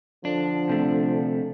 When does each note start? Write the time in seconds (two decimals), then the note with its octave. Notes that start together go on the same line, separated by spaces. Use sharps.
0.25 D3 F3 D4
0.69 C3 A3